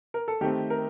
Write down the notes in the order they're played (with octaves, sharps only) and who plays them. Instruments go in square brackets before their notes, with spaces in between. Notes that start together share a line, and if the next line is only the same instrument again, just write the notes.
[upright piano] A#4
A4
[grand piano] D#3 A3 C4 [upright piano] G4
[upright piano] A#4